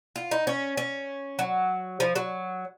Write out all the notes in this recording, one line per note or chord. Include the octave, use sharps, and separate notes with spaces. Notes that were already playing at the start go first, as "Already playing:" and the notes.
F4
D#4
C#4
C#4
F#3
F3
F#3